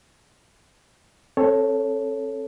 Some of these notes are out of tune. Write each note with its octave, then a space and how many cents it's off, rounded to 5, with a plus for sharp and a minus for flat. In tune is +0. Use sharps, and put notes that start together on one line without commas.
C4 +40 A4 +0 C#5 +0